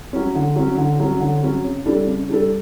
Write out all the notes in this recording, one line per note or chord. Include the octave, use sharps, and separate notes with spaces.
F#3 C#4
D3
F#3 C#4
D3
F#3 C#4
D3
F#3 C#4
C#3
G3 D4 A4
C#3
G3 D4 A4